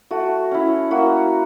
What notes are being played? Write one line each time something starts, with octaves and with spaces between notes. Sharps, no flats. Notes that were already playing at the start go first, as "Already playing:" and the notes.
A3 F#4
C#4 E4
A#3 F#4